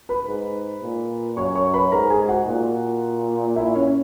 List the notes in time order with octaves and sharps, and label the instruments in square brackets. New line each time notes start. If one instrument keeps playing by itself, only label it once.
[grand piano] B4 B5
[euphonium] G#2
A#2
[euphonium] F#2 [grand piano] C#5 C#6
[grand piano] C#5 C#6
B4 B5
[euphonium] G#2 [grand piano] A#4 A#5
[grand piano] G#4 G#5
F#4 F#5
[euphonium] A#2
[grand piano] E4 E5
C#4 C#5